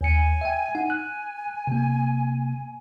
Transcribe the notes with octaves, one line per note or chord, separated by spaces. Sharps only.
D#2 G#5 C#7
E5 G5
D#4 F#5 G#5
F#6
C3 A#3